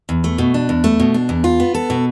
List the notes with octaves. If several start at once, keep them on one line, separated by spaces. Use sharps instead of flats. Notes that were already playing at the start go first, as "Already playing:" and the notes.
E2
A3
B2
D4
E2
A3
B2
D4
E2
F4
B3
A4
B2